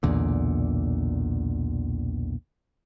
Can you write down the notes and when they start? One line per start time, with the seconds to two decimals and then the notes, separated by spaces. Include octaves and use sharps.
0.03 B1 E2 A#2 D3